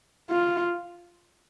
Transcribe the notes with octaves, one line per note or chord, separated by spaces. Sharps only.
F4